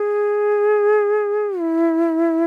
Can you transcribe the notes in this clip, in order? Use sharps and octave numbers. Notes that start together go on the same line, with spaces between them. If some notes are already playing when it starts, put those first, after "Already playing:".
Already playing: G#4
E4